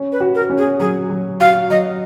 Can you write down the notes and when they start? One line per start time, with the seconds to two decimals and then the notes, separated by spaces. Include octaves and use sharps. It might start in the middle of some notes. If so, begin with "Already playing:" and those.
Already playing: C#4
0.12 B4
0.20 F#4
0.35 A#4
0.50 C#4
0.58 G#4
0.80 F#3 G#4
1.10 F#3
1.40 F#4 F5
1.70 F#3 D#5